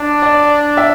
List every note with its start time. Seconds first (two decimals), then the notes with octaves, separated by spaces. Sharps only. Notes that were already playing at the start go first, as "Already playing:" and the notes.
Already playing: D4
0.22 D5
0.77 E5